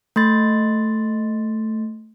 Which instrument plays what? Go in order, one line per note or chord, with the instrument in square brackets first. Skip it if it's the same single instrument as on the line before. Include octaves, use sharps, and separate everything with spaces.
[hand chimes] A3 C6 A6